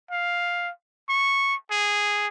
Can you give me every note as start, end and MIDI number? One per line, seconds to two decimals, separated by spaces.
0.11 0.70 77
1.09 1.55 85
1.71 2.28 68